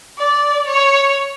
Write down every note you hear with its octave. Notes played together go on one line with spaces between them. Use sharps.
D5
C#5